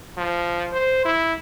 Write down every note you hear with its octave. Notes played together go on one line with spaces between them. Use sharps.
F3
C5
E4